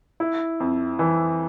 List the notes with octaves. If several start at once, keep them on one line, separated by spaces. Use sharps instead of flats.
E4
F2
E3